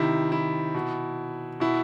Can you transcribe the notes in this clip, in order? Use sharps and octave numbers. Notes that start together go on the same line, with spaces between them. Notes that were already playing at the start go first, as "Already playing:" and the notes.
Already playing: C3 D#3 E4
E4
B2
B2 E4